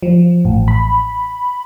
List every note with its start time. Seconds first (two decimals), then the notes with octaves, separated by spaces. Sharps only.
0.03 F3
0.45 A1
0.68 B5